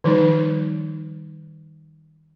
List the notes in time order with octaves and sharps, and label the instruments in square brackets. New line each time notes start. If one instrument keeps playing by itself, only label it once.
[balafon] D#3 F3 G3 D#4